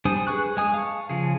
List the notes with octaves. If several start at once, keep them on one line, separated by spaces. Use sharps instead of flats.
G3 D4 C5 G#5 D#6
G#4 B4 G#5 C#6 F#6
G#3 G#5 D#6
F5 A5 C#6
C#3 F3 G#4